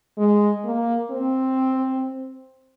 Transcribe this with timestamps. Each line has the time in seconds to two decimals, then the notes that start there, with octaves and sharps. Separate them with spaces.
0.18 G#3
0.65 A#3
1.11 C4